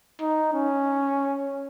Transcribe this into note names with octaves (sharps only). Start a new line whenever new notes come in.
D#4
C#4